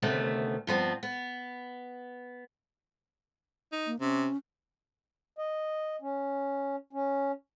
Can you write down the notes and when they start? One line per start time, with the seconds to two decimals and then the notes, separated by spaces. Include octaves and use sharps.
0.02 D2 C3 D#3 A3 B3 C#4
0.67 G2 F3 B3 C4
1.03 B3
3.72 D#4
3.87 A#3
4.00 C3 C#4
5.39 D#5
6.02 C#4
6.93 C#4